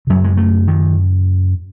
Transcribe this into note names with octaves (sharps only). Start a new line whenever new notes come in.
F#2 C#3 F#3
G#3
A3
D#3